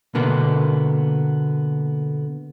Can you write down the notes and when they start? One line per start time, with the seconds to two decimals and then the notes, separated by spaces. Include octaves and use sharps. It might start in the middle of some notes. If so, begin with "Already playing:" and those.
0.15 B2 D3 A#3 B3